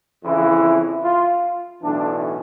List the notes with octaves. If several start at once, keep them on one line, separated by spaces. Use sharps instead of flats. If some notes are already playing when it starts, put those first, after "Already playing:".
F2 C#3 E3 E4
F4
B1 A2 E3 D4